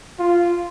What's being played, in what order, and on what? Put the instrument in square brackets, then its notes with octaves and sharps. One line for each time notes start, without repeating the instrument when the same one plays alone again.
[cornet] F4